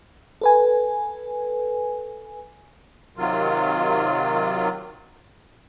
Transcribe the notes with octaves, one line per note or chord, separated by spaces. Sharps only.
A4 B4 G#5
C3 D#3 F#3 F4